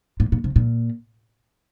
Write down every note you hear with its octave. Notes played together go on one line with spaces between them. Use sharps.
A2
A#2
C3
A#2